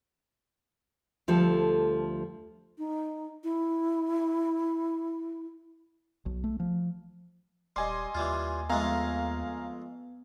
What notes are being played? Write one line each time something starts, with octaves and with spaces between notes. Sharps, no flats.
D2 F3 G3 A4
D#4
E4
B1
A3
F3
D#1 G3 D#5 G#5 C6
D#2 E3 G3 F4
F2 G#3 A3 B3 F5 G#5 A#5